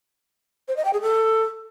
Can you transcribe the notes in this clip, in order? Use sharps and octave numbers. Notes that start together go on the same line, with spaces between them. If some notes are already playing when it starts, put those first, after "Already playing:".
C5
D#5
G5
G#4
A4